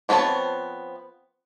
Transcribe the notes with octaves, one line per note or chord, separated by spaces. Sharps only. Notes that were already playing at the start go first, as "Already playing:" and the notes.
F3 B3 C4 C#5 A5